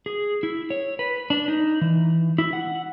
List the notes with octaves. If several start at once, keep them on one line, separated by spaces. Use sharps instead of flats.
G#4
E4
C#5
B4
D4
D#4
E3
E4
F#5